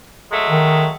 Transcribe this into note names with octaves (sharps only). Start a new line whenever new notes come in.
F#3 G#3 A3
D#3